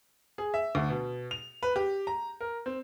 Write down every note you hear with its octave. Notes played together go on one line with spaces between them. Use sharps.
G#4
E5
D2
B2
F7
B4
G4
A#5
A#4
C4